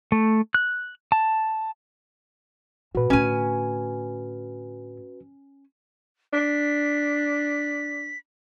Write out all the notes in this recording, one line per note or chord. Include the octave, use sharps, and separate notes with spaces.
A3
F#6
A5
A#2 F#4 B4
A2 D3 C#4 G#5
D4 B6